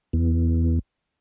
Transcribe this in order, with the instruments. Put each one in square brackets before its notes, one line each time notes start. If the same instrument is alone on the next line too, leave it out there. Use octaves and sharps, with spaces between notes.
[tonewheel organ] E2